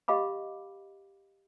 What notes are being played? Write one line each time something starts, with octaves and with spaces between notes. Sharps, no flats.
G4 D#5 F5 B5 D6